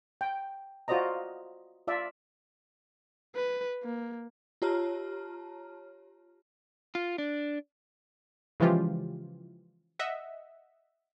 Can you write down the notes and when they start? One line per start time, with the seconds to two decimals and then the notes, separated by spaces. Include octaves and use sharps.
0.21 G5
0.88 F4 F#4 C5 D5 D#5 A#5
1.87 F4 D5 E5
3.35 B4
3.83 A#3
4.62 F4 G4 C#5 A5 A#5 F6
6.95 F4
7.18 D4
8.60 C#3 E3 F3 G#3 F4 G4
9.99 D#5 E5 F#5